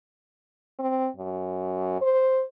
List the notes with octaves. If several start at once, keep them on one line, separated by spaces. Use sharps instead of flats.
C4
F#2
C5